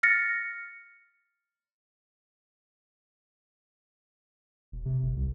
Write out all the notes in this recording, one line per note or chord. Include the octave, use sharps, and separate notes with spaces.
F6 A6 A#6 C#7
E1
C3
G1
C2